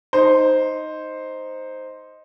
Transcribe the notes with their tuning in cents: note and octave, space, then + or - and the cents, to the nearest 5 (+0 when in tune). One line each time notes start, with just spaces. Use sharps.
D#4 +0 C5 +0